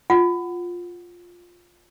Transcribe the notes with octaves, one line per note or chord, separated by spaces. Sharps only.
F4 F#5